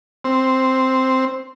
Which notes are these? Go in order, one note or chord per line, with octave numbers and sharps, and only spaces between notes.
C4